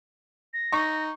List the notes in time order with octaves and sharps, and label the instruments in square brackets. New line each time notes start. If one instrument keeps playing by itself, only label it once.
[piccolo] A#6
[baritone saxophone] D#4 [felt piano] C#6